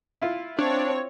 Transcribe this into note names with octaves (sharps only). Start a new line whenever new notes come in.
E4 F4
C4 D4 C#5